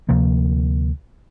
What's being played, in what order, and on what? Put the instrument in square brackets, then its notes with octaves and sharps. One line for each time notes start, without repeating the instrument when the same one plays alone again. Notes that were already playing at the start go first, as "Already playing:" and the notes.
[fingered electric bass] D2 C3 F3 A#3